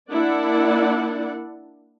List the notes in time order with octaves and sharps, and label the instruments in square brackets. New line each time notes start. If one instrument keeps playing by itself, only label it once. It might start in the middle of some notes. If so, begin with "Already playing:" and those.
[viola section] A#3 D4 E4 D5 F#5